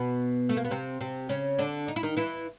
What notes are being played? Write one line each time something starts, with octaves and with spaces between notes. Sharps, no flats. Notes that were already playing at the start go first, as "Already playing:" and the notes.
Already playing: B2 B3
A3
A#3
B3
C3 C4
C3 C4
C#3 C#4
D3 D4
D#4
E4
D#3 D#4
E3 E4